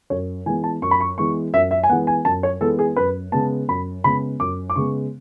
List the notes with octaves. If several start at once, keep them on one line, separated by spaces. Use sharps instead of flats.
F#2 C#5
E3 G#3 B3 G#5
A5
F#2 C#6
B5
C#6
E3 G#3 B3 C#6
F#2 E5
E5
G#5
E3 G#3 B3 F#5
G#5
F#2 A5
C#5
E3 G#3 B3 A4
G#4
F#2 B4
C#3 G#3 B3 A5
F#2 B5
C#3 G#3 B3 B5
F#2 D6
D6
C#3 G#3 B3 C#6